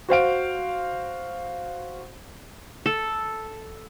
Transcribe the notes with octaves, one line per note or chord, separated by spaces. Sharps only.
F#4 C5 F5 D7
A4